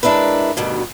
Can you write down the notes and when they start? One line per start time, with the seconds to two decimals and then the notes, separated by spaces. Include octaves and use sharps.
0.03 G#3 D4 E4 A#4 B4
0.57 D2 G2 B2 D#3